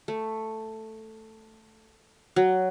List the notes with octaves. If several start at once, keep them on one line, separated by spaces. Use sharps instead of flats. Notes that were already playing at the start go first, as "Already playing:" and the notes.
A3
F#3